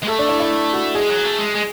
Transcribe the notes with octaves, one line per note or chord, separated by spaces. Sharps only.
G#3
A3 A4
D4
E4
E4
F#4
G#3 G#4
F#3
A3
G#3
G#3